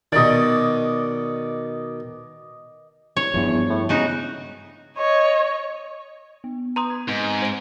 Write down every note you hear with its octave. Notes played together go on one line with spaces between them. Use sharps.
B2 D#3 D5 D#5
C2 C#5
E2 G2 F3
A2
E1 C#3 D#4 F#4
C#5 D#5
B3
B4 A#5 C6 D#6
G#6
G#2 C4 B4
C5 D7